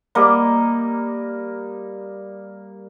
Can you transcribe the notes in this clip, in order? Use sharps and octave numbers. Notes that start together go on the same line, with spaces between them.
G3 A#3 A#4 D#5